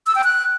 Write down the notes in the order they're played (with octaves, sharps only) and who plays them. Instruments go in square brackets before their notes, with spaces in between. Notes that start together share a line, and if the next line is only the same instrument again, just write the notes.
[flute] E6
G5
F#6